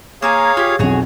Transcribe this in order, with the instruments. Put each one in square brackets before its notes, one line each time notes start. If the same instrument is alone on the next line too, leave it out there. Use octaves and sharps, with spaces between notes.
[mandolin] A#3 A#4 G#5 [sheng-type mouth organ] G#4 C#5 F5
[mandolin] F4 G4
[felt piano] B1 F2 [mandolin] F#4 G#4 C#5